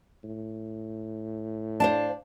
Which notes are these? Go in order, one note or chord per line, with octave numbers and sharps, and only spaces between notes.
A2
D4 C5 F5 A5